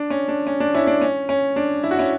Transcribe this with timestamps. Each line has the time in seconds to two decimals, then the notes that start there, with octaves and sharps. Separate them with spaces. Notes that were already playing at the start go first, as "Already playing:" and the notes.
Already playing: D4
0.10 C#4
0.28 D4
0.47 C#4
0.60 D4
0.74 C#4 E4
0.87 D4
1.01 C#4
1.29 C#4
1.56 D4
1.83 E4
1.91 F#4
1.99 C#4 E4